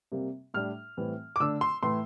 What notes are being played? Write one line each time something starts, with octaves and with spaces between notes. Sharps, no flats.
C3 G3 A#3
A2 G3 D4 F6
A2 E3 G3 C4
D6
D3 A3 D4 E6
C6
A2 E3 A3 C6